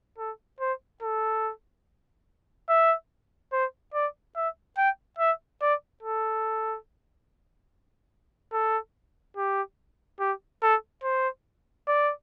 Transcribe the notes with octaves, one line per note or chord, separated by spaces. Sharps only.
A4
C5
A4
E5
C5
D5
E5
G5
E5
D5
A4
A4
G4
G4
A4
C5
D5